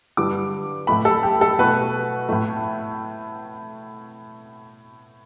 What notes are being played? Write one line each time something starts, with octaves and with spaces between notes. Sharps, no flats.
G2 D3 G3 D6
A2 A3 B5
A4
G4
A4
B2 A3 B4
A2 A3